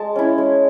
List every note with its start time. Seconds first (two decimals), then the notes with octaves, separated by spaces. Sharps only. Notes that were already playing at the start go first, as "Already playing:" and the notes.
Already playing: G#3 A5
0.16 C#4 E4
0.38 G#3